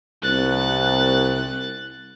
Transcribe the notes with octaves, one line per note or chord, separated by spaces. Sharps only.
C2 F#6 A6